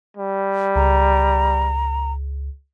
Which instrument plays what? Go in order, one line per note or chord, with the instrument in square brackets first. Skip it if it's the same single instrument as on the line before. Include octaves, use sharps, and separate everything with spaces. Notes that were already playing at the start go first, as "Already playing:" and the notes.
[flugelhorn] G3
[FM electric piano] C#2 [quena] A#5